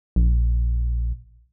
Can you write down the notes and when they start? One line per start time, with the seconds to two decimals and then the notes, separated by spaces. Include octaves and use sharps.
0.16 A#1